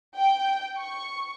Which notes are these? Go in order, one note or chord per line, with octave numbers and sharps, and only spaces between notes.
G5
C#6